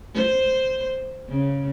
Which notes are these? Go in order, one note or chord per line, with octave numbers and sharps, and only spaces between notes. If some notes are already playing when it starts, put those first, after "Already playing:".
C5
C#3